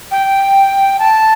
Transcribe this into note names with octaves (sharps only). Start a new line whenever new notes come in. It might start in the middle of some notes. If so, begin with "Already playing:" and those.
G5
A5